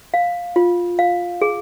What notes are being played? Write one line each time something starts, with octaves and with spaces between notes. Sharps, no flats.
F5
F4
F5
G#4